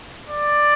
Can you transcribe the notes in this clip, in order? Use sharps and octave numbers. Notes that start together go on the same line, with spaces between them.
D5